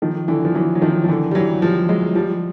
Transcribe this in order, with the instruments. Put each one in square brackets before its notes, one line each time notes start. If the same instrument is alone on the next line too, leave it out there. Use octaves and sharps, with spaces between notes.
[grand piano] D#3 F3
D3 E3
F3
E3 F#3
F#3
D#3 F3
F3
D3 E3
G3
E3 F#3
F3 G3
F#3 G#3
F3 G3